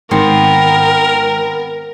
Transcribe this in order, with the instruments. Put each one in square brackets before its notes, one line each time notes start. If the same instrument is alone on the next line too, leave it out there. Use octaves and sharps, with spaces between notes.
[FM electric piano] G#2 D#3 [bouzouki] B3 C4 [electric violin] A#4